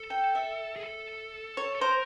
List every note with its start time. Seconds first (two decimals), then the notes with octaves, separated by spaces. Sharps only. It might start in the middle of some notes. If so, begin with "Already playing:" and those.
Already playing: A4
0.10 G5
0.35 E5
0.76 G#4
0.84 A4
1.57 C#5
1.75 A4
1.81 A#4 C5